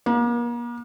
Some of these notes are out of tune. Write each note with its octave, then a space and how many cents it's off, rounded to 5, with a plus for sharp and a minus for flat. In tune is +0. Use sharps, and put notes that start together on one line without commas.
A#3 +40